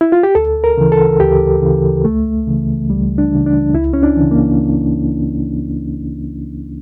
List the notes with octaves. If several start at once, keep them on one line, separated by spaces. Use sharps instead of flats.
E4
F4
G4
D2 A4
A#4
C#3 E3
A4
D2 G4
C#3 E3
C#2 A3
C#3 E3
C#2 G3
D4
C#3 E3
D4
C#2 E4
C#4
D4
C#3 E3
A#3